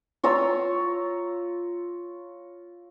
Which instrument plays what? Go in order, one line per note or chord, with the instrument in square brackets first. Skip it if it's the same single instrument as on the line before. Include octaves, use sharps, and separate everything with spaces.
[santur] F4 C#5 A#5 E6